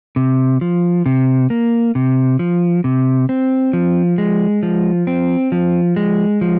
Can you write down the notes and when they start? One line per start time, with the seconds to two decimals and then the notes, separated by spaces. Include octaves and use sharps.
0.16 C3
0.61 F3
1.06 C3
1.50 A#3
1.95 C3
2.39 F3
2.84 C3
3.29 C4
3.73 F3
4.18 G#3
4.63 F3
5.07 C4
5.52 F3
5.96 G#3
6.41 F3